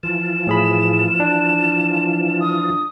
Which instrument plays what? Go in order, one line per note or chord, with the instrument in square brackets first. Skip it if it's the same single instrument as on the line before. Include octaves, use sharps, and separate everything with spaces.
[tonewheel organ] E3 F3 F4 [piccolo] E7
[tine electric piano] A2 G#4 B5
D4
[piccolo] D#6